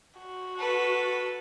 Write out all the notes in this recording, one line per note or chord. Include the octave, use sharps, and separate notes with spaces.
F#4
A4 B4